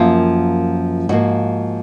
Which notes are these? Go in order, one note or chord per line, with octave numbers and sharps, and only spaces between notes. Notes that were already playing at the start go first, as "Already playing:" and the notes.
Already playing: F#2 F3 A#3 F4
G#2 F3 A#3 F#4